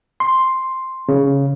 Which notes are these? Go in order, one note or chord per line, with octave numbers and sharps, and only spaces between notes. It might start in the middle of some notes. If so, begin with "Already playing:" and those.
C6
C#3